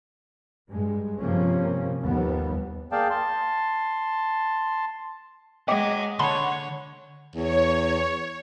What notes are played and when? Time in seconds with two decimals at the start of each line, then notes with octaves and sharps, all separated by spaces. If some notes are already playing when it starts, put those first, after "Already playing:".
0.71 G2 G#3
1.21 G2 C3 F3 A#3 C#4
2.01 G1 D#2 F3 G3 B3
2.92 A#3 G#4 D5 F5 G5 A5
3.10 A5 C6
5.68 G#3 C#5 D#5 F#5 G5 D6 B6
6.19 D3 D4 C#5 F#5 A5 B5 C6
7.36 E2 C#5